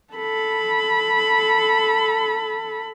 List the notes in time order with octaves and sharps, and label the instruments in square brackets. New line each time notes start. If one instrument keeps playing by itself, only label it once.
[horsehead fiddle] A4 B5